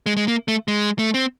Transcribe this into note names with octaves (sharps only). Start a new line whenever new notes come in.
G#3
G#3
A#3
A3
G#3
A3
C4